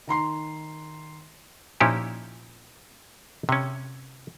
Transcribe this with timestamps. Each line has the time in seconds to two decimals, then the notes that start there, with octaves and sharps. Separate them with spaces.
0.07 D#3 A#5 C6 C7
1.80 A#2 F3 C#4 D#4 E4 G4
3.49 C3 C#4